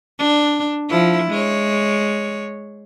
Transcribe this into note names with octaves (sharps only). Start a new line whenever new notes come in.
D4
F3 E4
G#3 C#5